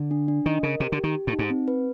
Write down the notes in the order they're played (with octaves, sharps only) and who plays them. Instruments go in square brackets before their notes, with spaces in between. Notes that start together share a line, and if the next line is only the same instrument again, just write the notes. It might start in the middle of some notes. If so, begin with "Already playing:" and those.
Already playing: [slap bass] D3
[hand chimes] D4
D4
[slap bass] D#3 [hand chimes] D#5
[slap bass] C#3 [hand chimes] A#4
[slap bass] C3 [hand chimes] G4
[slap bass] D3
[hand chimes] G4
[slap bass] D#3
[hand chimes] G4
[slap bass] A2
[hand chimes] D#4
[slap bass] G#2
[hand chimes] C4
B4